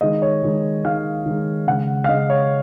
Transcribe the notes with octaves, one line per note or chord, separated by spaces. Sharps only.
D#3 G#3 D#5
C#5
D#3 G#3
D#3 G#3 F5
D#3 G#3
C#3 G#3 F#5
F5
C#3 G#3 D#5
C#5